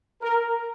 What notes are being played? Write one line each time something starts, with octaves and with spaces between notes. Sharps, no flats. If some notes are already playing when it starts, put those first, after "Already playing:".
A#4